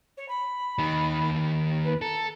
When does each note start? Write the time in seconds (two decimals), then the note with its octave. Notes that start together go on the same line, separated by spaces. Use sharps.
0.17 C#5
0.28 B5
0.78 D#2 D#3
1.84 B4
2.02 A4 A#5